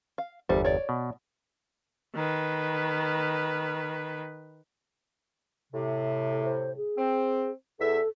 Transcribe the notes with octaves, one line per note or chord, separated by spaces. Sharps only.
F5
G1 E2 G3 C5
C#5 D5
B2
D#3 B4
A2 C3
A4
C5
G#4
C4
E2 A4 E5